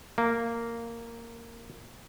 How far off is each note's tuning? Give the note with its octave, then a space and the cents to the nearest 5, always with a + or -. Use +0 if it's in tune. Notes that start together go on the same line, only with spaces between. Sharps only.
A#3 -10